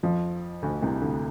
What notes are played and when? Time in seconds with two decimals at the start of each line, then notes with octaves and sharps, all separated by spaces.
0.03 F2 F3
0.63 D2 D3
0.82 C2 C3
1.02 D2 D3